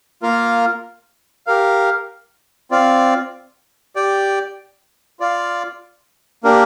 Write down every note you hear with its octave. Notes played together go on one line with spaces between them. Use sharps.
A#3 F4 A#4 F5
G4 A#4 F5
C4 F4 D5 F5
G4 D5 G5
F4 D5 F5
A#3 D4 G4 A#4